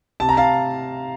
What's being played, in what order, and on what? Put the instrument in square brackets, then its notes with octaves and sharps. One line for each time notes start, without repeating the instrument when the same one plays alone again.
[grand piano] C3 A5
A#5
F5 A5